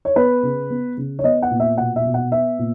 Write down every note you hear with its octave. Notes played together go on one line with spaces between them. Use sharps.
C#5
B3 B4
C#3
B3
C#3
C#5
B3 D#5
F#5
A#2
E5
B2 F#5
E5
B2
F#5
B3 E5
A#2